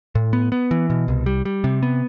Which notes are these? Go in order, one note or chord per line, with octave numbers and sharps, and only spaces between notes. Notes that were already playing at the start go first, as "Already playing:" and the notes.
A2
B3
B3
E3
B2
C2
G3
G3
C3
B3